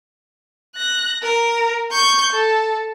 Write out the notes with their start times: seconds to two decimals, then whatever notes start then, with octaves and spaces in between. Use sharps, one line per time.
0.76 F#6 A#6
1.22 A#4
1.92 C#6 G6
2.33 A4